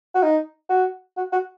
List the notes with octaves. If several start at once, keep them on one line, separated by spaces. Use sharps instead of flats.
F#4
D#4
F#4
F#4
F#4